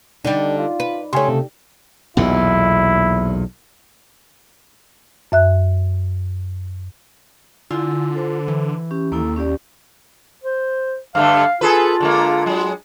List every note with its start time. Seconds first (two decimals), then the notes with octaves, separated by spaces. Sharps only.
0.25 D3 G3 D4 D#4 D5
0.58 F4
0.80 B4
1.13 C#3 A3 G4 C#5 G#5 C6
1.28 C3
2.17 B1 E2 A#2 E4
5.32 F#2 E5 F#6
7.71 D3 E4 F4 G#5
8.15 A4 C5
8.48 E3
8.91 C#4 G4
9.12 D#2 A#3 E4 A4
9.36 C#4 G4 D5
10.44 C5
11.15 G2 D3 A3 F5
11.61 F4 G#4 A4 B4
12.00 D3 G#3 A#3
12.46 F#3 G#3